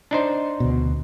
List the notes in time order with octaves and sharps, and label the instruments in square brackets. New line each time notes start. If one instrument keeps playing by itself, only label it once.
[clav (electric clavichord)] D4 D#4 C5
[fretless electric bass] D2 B2